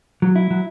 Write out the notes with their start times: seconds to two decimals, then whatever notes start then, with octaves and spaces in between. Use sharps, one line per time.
0.22 F#3
0.36 E4
0.51 F#3